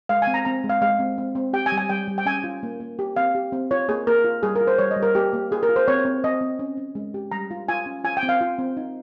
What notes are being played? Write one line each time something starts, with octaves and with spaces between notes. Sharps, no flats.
G#3 F5
G#5
C4
A#5
C4 A#5
G#3
F5
G#3 F5
C4
C4
C4
G4 G5
G#5
G3
G#5
G3 G5
G3
G5
C#4 G#5
F4
A#3
A#3
G4
C4 F5
G4
C4
F4 C#5
A#3 G#4
A#3 A#4
F4
G3 G#4
A#4
F4
C5
G3 C#5
D#5
G3
A#4
A#3 G4
A#3
F4 G#4
A#4
F4
C5
C4 C#5
C4
C4 D#5
C4
C#4
C#4
G#3
G4
G3 A#5
F4
F4 G#5
C#4
F4 G#5
G5
C4
F5
F4
C4
D#4